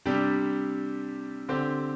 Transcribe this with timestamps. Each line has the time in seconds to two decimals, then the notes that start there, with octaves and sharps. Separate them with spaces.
0.06 C3 G3 D4 G4
1.49 D3 C4 G4